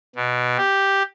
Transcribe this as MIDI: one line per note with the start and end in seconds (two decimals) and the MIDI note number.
0.16 0.57 47
0.57 1.03 67